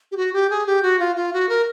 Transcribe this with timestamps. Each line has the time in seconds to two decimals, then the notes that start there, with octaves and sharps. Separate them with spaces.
0.12 G4
0.17 F#4
0.33 G4
0.50 G#4
0.66 G4
0.83 F#4
0.99 F4
1.16 F4
1.33 F#4
1.49 A#4